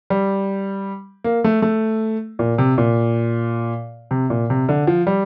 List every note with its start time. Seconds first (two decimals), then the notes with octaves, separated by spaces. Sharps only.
0.10 G3
1.24 A#3
1.44 A3
1.62 A3
2.39 A#2
2.58 C3
2.78 A#2
4.11 C3
4.30 A#2
4.50 C3
4.69 D3
4.87 F3
5.07 G3